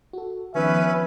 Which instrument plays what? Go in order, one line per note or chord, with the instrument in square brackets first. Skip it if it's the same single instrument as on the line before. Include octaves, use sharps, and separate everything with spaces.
[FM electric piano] F#4 A4
[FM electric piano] D#3 F3 B3 [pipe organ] C#4 [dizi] B4 [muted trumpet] E5